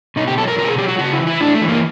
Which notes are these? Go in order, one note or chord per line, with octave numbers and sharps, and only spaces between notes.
B2 D#4
G4
F#3 A4
A#4
B2 A#4
G4
G#4
F#3 G4
F#4
C#3 F#4
E4
E3
E4
A2 D4
A3
E3
A#3